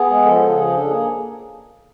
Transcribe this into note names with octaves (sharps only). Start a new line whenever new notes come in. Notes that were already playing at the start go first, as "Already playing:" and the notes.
Already playing: B3 G#4
G#3
F3 A4
C#3
F3 G#4
D4 A4
A#3 G#4